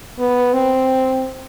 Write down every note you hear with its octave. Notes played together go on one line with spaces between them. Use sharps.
B3
C4